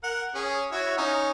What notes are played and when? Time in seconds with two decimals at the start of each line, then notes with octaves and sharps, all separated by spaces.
0.03 A#4 F#5
0.35 C#4 G#4
0.72 E4 F#4 C#5
0.98 C#4 D#4